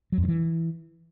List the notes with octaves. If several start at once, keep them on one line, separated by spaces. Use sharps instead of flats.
F#3
F2
G2
E3